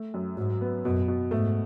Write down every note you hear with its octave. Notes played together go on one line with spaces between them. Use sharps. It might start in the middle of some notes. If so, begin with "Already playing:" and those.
Already playing: A3
F#2
G#2 F#3
B3
F#2 B2
B2
G#2 A3